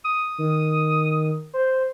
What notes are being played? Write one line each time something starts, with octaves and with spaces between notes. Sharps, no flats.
D#6
D#3
C5